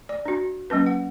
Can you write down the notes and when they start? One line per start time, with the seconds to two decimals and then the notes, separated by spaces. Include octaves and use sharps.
0.09 D5
0.26 D4 F#4
0.70 F#3 A#3 C#4 B4
0.86 F#5